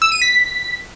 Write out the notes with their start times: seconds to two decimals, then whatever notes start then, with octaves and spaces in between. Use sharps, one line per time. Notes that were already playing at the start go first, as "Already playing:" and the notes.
0.02 E6
0.12 D#7
0.22 B6